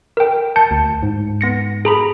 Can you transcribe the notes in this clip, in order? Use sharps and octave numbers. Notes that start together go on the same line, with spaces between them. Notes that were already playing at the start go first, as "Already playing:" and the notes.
A#4 G5
A5 G6 C#7
D2
G#2
B3 A#6 C#7
G#4 A#5 B5